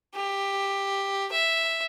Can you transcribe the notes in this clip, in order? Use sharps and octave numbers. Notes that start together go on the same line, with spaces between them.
G4
E5